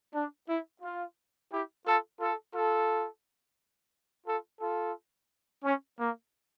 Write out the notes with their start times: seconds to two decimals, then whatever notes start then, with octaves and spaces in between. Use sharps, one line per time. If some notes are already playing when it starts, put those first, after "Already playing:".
0.14 D4
0.48 E4
0.82 F4
1.51 E4 G4
1.86 F4 A4
2.19 F4 A4
2.54 F4 A4
4.26 F4 A4
4.60 F4 A4
5.63 C#4
5.98 A#3